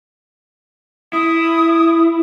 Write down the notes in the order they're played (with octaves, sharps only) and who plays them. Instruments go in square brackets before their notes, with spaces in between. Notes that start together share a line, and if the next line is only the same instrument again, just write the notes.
[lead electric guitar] E4 [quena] D#6